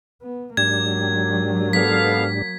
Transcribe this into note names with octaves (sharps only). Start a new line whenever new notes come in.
B3
G#2 F#3 A#3 D4 G4 G#6
B3 A4 F5 B6